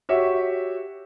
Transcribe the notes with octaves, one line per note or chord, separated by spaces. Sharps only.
F#4 G4 C#5 E5